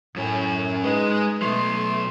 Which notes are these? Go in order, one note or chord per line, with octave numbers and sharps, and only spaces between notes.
F#2 A2 C#4
G#3 D#4 B4
B2 F#3 A3 C6